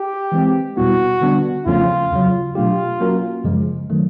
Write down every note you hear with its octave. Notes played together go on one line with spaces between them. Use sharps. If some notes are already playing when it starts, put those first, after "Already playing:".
Already playing: G4
E3 G#3 C4
E2 B2 G3 B3 E4 F#4
D3 G3 B3 D4
E2 C#3 F3 A3 C#4 F4
E2 C#3 F#3
B2 F#3 A3 D4 F4 G4
F#3 A#3 C#4 F#4 A#4
F#2 C#3 F3 G#3
D#3 F#3 A3